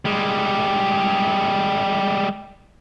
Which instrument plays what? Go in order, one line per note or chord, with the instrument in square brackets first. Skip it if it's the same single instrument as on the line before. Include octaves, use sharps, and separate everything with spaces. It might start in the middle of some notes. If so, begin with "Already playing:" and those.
[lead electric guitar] G3 G#3